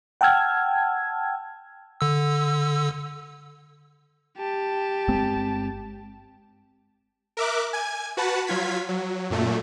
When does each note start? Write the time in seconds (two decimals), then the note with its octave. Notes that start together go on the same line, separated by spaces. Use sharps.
0.21 F#5 G5 A5 E6 F6 G#6
2.01 D3 E6
4.38 G4 A5
5.08 G1 G#3 C4
7.37 A#4 E5 D6 F#6
7.73 G#5 G#6
8.17 F#4 B4 F#5 A5
8.47 F#3 F4 G#6 B6
8.89 F#3
9.30 F#2 A#2 A3